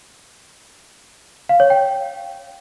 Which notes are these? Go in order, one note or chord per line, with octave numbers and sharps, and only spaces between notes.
F5
C#5
G5